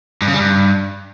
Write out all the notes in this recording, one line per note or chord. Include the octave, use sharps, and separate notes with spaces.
G2
C#3
G3
G2